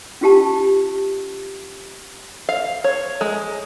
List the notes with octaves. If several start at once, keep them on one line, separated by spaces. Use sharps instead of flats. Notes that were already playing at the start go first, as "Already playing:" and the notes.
C#4 F4 G4 A5
F5
C#5
G#3